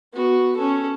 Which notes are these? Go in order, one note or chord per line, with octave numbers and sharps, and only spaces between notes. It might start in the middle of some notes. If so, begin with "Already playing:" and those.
B3 F#4
C#4 A4